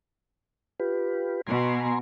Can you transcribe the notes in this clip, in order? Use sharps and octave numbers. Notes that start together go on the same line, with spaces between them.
F4 G4 B4
B2 G#5 A#5 C6